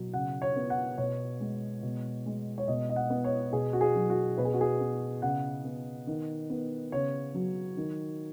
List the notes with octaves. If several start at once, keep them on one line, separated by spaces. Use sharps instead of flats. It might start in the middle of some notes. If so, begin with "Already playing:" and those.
Already playing: B2 F#3
C#3 F#5
C#5
B3
F#5
B2 C#5
G#3
B2
G#3
C#5
B2 D#5
D#5
F#5
B3
C#5
B2 G#4
F#4
G#4
F#3
F#4
B2 B4
G#4
F#4
G#4
B3
C#3 F#5
B3
D#3
B3
C#3 C#5
F#3
D#3